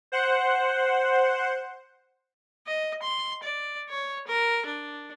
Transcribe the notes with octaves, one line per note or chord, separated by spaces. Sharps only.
C5 F#5
D#5
C6
D5
C#5
A#4
D4